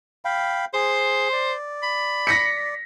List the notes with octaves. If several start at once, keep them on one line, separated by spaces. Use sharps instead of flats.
F5 G5 B5
G#4 C5 C6
D5
B5
A#6 B6 C#7